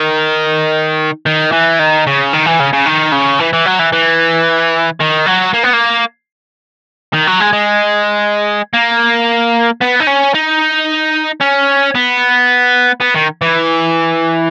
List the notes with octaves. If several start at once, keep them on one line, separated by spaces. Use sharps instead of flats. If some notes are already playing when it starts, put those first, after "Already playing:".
Already playing: D#3
D#3
E3
D#3
C#3
D#3
E3
C#3
C#3
D#3
C#3
E3
E3
F#3
E3
E3
D#3
F#3
A#3
B3
A#3
D#3
F#3
G#3
G#3
A#3
B3
D#4
C#4
D#4
C#4
B3
B3
D#3
E3